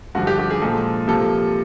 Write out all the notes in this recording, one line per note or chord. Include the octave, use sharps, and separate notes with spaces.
G2 D3 F3 F#4
G4
G4
G#4
A#2 F3 G#3 A4
C3 F3 A#3 A4